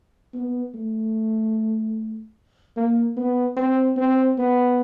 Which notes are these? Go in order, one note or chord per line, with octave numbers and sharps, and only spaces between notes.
B3
A3
A#3
B3
C4
C4
B3